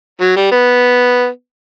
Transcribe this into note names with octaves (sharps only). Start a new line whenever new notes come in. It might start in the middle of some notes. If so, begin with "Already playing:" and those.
F#3
G3
B3